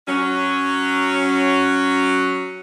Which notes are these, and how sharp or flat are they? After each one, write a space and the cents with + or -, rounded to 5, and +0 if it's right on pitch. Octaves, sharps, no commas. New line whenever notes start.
F#3 +0 C#4 +0